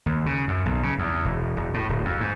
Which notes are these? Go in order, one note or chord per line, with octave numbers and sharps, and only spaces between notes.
D#2
C#3
F#2
B1
C#3
E2
E1
E1
A2
D1
F2
G#2